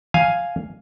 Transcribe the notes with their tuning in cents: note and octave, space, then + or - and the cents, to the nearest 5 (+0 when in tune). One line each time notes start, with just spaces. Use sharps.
F5 +0 G#5 +0